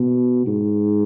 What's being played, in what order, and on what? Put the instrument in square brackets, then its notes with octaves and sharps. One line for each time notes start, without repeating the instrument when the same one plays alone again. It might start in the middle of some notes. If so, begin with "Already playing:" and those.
Already playing: [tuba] B2
G#2